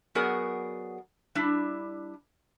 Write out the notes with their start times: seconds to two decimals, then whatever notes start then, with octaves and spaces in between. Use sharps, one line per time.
0.15 F#3 B3 F#4 G#4 A#4 D5
1.35 G3 D4 E4